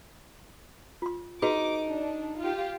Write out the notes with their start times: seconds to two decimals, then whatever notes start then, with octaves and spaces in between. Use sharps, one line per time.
1.02 F4 C6
1.42 D#4 F#4 G#4 B4 D6
1.89 D4
2.40 F4 G4